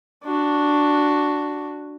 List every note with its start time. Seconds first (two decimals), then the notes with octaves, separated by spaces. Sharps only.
0.24 D4 F#4